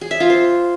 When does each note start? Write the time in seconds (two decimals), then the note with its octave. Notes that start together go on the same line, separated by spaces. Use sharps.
0.01 G#4
0.11 E5
0.20 F4
0.30 C5